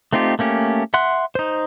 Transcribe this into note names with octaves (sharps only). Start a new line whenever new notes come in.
A3 C4 D#4 F4 G4
A3 A#3 C#4 G4
E5 F#5 C6 F#6
D#4 C5